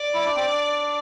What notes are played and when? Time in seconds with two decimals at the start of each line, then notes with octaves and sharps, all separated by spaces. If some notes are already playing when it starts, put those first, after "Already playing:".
Already playing: D5
0.14 E4
0.25 D4
0.36 C4
0.46 D4